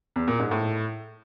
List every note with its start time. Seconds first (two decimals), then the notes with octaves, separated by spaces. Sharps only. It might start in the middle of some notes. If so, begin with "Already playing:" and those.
0.16 E2
0.28 A#2
0.39 G#2
0.51 A2